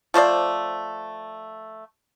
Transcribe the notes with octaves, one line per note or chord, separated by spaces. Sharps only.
F3 A3 C5 D5